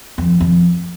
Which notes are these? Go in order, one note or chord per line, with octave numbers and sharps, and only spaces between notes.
F2
F2